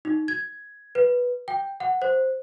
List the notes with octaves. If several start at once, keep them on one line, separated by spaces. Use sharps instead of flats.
D#4
G#6
B4
G5
F#5
C5